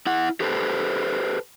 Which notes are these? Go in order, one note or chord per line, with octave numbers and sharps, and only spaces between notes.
E4 F#5
G4 A4 B4 C5